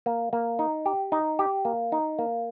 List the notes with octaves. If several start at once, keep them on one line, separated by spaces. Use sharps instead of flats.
A#3
A#3
D#4
G4
D#4
G4
A#3
D#4
A#3